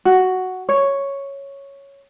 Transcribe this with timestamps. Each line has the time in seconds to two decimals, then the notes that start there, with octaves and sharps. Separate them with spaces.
0.05 F#4
0.69 C#5